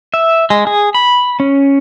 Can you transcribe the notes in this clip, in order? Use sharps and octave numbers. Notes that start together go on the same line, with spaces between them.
E5
G#3
G#4
B5
C#4